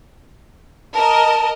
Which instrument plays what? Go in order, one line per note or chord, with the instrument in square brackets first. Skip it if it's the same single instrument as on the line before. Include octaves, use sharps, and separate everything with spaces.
[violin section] A#4 D#5 [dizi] A5